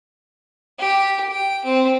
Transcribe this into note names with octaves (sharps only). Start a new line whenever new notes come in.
G4
G5
C4